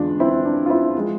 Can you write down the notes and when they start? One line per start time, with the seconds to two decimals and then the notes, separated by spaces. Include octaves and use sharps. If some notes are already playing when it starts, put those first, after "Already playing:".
Already playing: E2 D3 G#3 D4 F4
0.20 C4 E4
0.45 D4
0.66 F4
0.70 C4 E4
0.97 F3 G#3